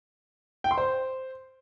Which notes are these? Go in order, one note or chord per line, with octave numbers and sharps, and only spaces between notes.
G5
C6
C5